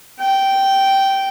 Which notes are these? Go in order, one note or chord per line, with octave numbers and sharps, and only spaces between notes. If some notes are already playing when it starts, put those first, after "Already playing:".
G5